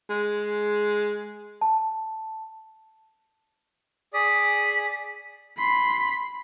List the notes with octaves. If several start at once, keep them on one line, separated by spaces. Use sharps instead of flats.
G#3
A5
G#4 D5 D#6 B6
B5 C6